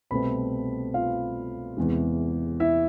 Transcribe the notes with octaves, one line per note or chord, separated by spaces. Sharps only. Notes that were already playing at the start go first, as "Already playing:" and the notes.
C2 B2 A3 C4 B4 B5
F4 F5
E2 C3 E3 G#3
E4 E5